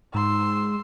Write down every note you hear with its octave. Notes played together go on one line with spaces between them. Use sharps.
G#2 C6 E6